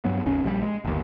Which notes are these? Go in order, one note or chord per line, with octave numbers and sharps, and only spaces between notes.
G2 F#3 B3
G#1 D#2 C#3 C#4
A#1 F3 G3
G#3
G1 D#2